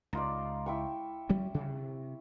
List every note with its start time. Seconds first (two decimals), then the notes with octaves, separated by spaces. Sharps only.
0.13 C#2 D#4 F4 D5
0.66 E4 G5 C#6
1.29 F#3 G3 C#4
1.54 C3